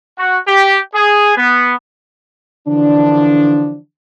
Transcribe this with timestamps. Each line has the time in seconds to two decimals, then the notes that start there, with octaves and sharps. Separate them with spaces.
0.17 F#4
0.47 G4
0.93 G#4
1.36 B3
2.68 D3 E3 F3 D4